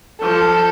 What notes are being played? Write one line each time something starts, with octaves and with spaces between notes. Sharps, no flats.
F3 A4